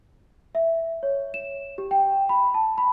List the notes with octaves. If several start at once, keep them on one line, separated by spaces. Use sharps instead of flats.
E5
C#5
E7
G4
G5
B5
A5
B5